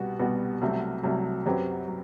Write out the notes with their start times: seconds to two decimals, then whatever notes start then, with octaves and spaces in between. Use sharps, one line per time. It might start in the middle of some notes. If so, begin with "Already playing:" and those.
Already playing: C2 B2 G3 B3 F#4
0.19 C2 B2 G3 B3 F#4
0.61 C2 C3 F#3 A3
1.03 C2 C3 F#3 A3
1.46 F#2 F#3 C4 G4 B4
1.88 F#3